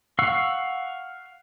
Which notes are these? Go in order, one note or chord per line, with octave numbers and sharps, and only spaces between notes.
F5 F#5 C#6 E6